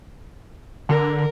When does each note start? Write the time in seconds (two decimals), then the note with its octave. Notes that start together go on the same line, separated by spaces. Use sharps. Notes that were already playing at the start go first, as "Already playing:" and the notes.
0.89 D3 A#4